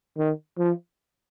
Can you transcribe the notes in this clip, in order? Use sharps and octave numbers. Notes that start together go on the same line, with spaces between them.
D#3
F3